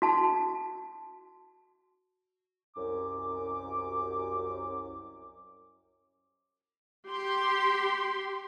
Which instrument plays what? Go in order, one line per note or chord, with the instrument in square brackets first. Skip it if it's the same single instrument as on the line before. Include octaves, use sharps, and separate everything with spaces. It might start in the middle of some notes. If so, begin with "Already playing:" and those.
[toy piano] F#4 A5
[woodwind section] C2 F#2 D6
[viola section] G4 C6